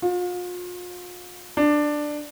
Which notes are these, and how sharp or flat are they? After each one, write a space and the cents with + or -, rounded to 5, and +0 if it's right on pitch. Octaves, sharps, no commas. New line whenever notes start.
F4 +40
D4 +10